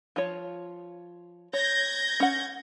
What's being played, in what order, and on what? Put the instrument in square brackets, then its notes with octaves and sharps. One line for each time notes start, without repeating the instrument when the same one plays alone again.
[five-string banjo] F3 F4 C#5
[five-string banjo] C#5 [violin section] G6 G#6 A#6
[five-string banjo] C#4 F#5